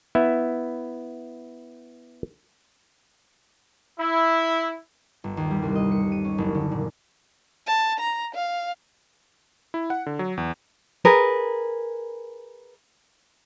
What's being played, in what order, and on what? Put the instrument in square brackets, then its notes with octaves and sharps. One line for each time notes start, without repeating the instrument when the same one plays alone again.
[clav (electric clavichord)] B3 E4 E5
[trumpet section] E4
[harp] G1
D#2
G3
C2
D#5
C#7
D#7
C#4
F#1
D3
A#2
[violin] A5
A#5
F5
[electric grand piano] E4
F#5
D3
F#3
E2
[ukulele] G#4 A#4 B4